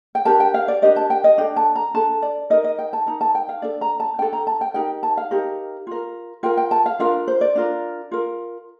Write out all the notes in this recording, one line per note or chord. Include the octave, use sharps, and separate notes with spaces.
G5
D4 G4 A#4 A5
G5
F5
D5
D4 G4 A#4 D#5
A5
G5
D#5
D4 A4 G5
A5
A#5
D4 A4 A5
D5
D#4 A#4 D#5
D#5
G5
A5
D#4 A#4 A#5
A5
G5
F5
D4 A4 D5
A#5
A5
D4 A4 G5
A#5
A5
G5
D#4 G4 A#4 G5
A5
F5
D#4 G4 A#4
F4 A#4
F4 A#4 G5
G5
A5
F5
D4 F4 A#4 F5
C5
D5
D4 F4 A#4
F4 A#4